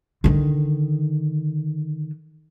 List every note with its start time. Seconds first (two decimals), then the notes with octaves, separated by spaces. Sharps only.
0.24 D3 D#3